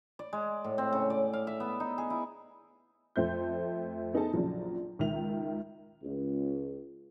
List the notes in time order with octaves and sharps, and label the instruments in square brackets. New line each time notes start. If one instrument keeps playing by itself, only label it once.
[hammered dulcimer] D5
G#3
A2
C4
C#3
D5
F5
E5
B3
D#4
G#4
E4
[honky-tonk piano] F2 A3 C5 E5 G6
B3 D#4 G#4 A4 A5
A#1 C#3 F3 F#3
C#2 D#3 E5 F7
[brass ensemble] C#2